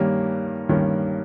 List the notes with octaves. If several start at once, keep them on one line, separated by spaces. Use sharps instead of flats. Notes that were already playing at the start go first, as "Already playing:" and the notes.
Already playing: G2 D#3 G3 A#3 C#4
G2 D#3 G3 A#3 C#4